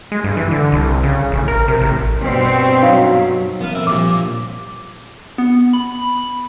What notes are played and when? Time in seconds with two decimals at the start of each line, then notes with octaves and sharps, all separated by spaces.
0.12 G#3
0.24 G2
0.37 E3
0.51 D3
0.72 C2
1.03 C#3
1.32 A1
1.48 A#4
1.68 C3
1.81 A1
2.21 G2 B2 C4
2.82 F#3 D#4 C#5 F5
3.61 F#2 B3 F5
3.75 A2 C4 E5
3.87 G2 A#2 F3 D6
5.38 B3
5.73 B5